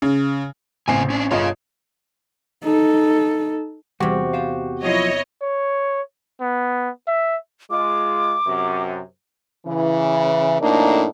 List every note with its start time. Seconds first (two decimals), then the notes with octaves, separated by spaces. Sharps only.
0.02 C#3
0.88 A1 C#3 B3 C4 G#5 C7
1.10 C#4 D4
1.31 G1 F4 G#4 C#5 D#5
2.64 D#4 A4
4.00 E2 C3 G3 F#4 G4
4.33 C5 F5
4.83 F3 F#3 E4 F4 C#5 D#5
5.42 C#5
6.41 B3
7.07 E5
7.71 G#3 F4 D6
8.46 F#2 C3
9.66 C#3 E3
10.61 F2 A2 A#3 D4 D#4